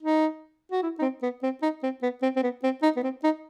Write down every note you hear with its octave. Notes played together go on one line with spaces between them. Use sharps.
D#4
F#4
E4
D#4
C4
B3
C4
D#4
C4
B3
C4
C4
B3
C4
D#4
B3
C4
D#4